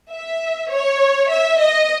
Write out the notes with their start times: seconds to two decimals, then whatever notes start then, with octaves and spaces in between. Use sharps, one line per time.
0.10 E5
0.70 C#5
1.30 E5
1.60 D#5